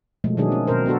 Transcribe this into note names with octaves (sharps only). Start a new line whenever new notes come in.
B2 F3 G#3 A3
B2 D#3 F#3 D4 G#4
C#4
B2 C4 A#4 C5
B3 D4 F#4 A4